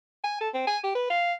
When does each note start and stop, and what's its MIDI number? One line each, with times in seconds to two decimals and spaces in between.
0.24 0.37 80
0.41 0.49 69
0.54 0.66 60
0.67 0.78 80
0.84 0.93 67
0.95 1.07 71
1.10 1.33 77